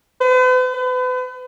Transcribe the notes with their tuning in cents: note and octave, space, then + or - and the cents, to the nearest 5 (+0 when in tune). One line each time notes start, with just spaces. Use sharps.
B4 +45
B4 +40